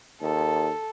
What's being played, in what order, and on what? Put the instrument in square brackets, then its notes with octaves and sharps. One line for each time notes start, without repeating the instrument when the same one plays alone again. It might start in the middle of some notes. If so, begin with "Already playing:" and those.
[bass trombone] D#2 [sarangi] A4